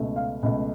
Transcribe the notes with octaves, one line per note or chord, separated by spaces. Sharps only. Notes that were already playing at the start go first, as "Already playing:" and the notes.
Already playing: C#2 B2 A3
F5
C#2 B2 A3